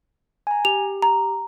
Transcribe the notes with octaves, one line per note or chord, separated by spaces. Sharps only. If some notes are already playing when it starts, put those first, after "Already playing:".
G#5 A#5
G4 F7
A#5